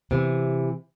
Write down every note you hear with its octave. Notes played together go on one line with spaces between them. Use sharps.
C3 E3